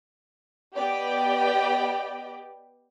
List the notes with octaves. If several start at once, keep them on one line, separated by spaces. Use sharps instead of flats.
B3 G4 D5 D#5 G5